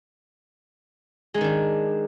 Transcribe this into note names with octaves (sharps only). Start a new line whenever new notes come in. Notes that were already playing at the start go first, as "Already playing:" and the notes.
D#3 G#3 D4 D#4